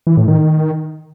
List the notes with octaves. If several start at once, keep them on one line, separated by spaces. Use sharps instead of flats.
E3
A2
D#3
D#3